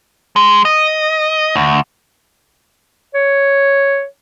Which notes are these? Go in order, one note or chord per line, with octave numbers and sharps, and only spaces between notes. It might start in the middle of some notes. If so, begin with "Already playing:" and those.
G#3
D#5
D2
C#5